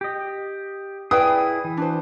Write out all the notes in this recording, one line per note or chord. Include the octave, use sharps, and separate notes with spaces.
G4 D#5
E4 G#4 B4 D5 G5 D#6
E3
D4 F#4 C5